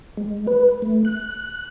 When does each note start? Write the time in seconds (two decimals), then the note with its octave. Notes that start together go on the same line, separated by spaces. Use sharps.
0.17 G#3
0.47 B4
0.82 A3
1.05 F#6